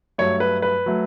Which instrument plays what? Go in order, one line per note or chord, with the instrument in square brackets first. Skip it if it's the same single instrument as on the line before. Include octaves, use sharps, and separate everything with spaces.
[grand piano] G2 F#3 A3 C#5
B4
B4
F#3 A3